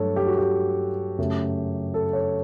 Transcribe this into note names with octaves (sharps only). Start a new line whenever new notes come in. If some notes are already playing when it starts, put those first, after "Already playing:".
Already playing: G2 F#3 A3 A4 C#5
G4
F#4
G4
F#2 C#3 F#3 A3
A4
C#5